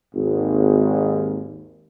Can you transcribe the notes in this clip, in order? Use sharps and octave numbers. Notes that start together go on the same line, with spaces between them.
G#1 D#2